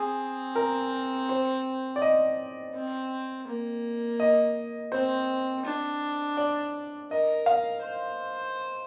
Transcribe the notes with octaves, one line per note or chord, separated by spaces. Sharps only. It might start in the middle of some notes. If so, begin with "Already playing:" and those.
Already playing: C4 G#4
A#4
C5
D5
D#5
C4
A#3
D#5
C4 C5
D4
D5
A#4 D#5
F5
C5